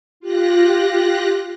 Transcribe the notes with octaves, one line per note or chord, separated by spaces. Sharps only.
F4 G4 F#6 A#6